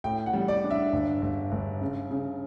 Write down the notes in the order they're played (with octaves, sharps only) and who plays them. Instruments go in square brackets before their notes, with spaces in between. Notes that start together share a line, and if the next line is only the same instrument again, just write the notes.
[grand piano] A2 G5
F#5
G3
D5
D4
E5
G1
G1
G1
C#3
C#3